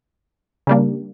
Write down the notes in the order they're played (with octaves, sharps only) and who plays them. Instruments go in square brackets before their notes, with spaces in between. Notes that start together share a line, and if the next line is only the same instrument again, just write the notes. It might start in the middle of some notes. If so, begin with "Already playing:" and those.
[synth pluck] C#3 G3 A#3 D4